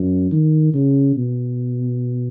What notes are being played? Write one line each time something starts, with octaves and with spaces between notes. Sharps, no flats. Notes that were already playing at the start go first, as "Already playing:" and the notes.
Already playing: F#2
D#3
C#3
B2